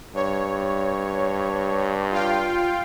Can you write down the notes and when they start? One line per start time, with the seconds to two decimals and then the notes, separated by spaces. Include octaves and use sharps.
0.15 G2 C#5
2.11 F4 F5 G5